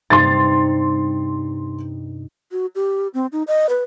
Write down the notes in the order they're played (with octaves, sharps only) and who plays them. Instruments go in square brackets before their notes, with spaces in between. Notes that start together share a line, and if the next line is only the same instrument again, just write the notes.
[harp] G2 C3 D#4 [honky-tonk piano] C6 A6
[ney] F#4
G4
C4
D#4
D#5
B4